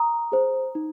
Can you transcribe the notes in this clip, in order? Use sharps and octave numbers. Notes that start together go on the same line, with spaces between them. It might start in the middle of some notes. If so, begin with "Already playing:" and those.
Already playing: A#5 D#6
G#4 C5
D#4